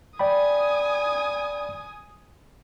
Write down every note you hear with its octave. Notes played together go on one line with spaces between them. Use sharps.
D5 G5 G#5 B5 D#6